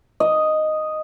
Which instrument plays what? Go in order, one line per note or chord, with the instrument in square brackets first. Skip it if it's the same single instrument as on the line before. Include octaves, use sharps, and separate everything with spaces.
[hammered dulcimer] D#5